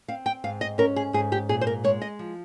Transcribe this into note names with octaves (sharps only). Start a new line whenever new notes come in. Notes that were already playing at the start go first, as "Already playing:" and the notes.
C4 F5
G5
G#2 F5
D#5
C#4 A#4
G#4
G#2 G#4
G4
A#2 G#4
C5
A#4
G#3 C#5
D#5
F3